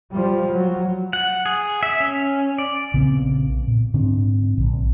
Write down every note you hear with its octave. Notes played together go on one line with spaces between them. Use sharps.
F3 G3
F#3
F#5
G#4
E5
C#4
D5
A#1 C#3 B3 C4
A#2
G#2 D3 C4 D4
A#1